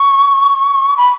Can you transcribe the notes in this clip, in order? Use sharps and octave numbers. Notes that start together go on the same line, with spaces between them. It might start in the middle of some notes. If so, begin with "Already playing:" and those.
Already playing: C#6
B5